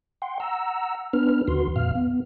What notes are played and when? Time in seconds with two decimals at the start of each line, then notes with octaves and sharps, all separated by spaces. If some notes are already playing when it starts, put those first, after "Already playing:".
0.22 F#5 G5 C6
0.40 F#5 A#5 E6
1.13 B3 D4 B4 F6
1.48 D#2 D3 D#3 F#4 B4 C6
1.76 F2 A#2 F5 F6
1.95 B3